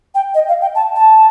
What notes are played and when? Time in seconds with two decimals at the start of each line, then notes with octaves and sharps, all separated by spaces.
0.15 G5
0.34 D#5
0.48 F5
0.61 G5
0.75 A5
0.96 A5